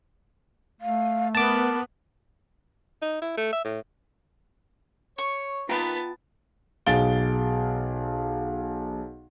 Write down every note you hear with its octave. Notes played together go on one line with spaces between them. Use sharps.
A3 F5
B3 A#4 A5 D6
D#4
E4
A3
E5
A2
C#5 C#6
D#3 B3 F4 B4 G5 A5 A#5
B1 G#4 F5 A6 D7 G7